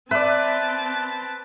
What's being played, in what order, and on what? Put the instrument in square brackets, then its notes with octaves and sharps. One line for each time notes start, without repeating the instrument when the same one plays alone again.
[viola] C4 A5 [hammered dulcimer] B4 D5 [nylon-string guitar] E5